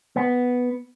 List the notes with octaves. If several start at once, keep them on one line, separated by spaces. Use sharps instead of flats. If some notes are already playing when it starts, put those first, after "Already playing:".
B3